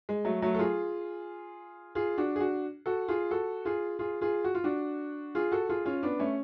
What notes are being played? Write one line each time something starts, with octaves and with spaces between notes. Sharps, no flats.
G#3
F#3 A3
F#3 A3
A4
F4 G#4
F4 G#4
D4 F#4
G#4
D4 F#4
F#4 A4
F4 G#4
F#4 A4
F4 G#4
F4 G#4
F4 G#4
F#4
F4
D4 F#4
F4 G#4
F#4 A4
F4 G#4
C#4 F4
B3 D4
A3 C#4